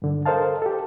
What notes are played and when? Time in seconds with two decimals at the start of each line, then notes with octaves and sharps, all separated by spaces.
0.02 G2 D3
0.26 A4 A#4 C5 D#5 F5 A5
0.62 G4 A4